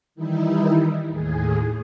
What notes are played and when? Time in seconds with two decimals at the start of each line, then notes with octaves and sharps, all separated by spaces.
0.15 D#3 E3 G3 D#4 E4
1.08 D#2 A2 G#4